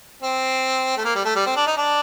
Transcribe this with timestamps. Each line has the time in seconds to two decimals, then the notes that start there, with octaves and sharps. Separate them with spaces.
0.22 C4
0.97 A3
1.05 A#3
1.15 G3
1.25 A3
1.36 G3
1.46 C4
1.56 D4
1.66 D#4
1.77 D4